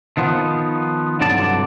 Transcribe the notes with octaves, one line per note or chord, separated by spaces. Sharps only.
D#3 F3 B3
C2 G2 D3 F#3 D5 A5